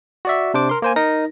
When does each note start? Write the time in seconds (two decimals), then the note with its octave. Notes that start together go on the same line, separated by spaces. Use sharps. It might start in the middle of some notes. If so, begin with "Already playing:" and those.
0.25 F#4 D5 E5
0.54 C3 D4 C5 D6
0.69 A#4 C6
0.82 A#3 C5 G#5
0.96 D#4 A#4 A#6